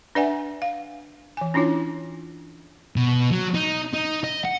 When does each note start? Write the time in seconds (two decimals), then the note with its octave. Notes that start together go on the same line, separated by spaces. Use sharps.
0.15 D4 B4 D5 E5 F#5 G#5
0.62 F5
1.37 E3 G#5
1.54 C#4 D4 E4 F4 C#5
2.96 B2
3.32 F#3
3.54 D#4
3.93 D#4
4.24 D#5
4.45 F#5